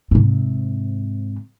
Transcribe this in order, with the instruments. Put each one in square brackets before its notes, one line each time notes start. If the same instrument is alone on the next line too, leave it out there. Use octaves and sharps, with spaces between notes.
[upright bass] G#2 C3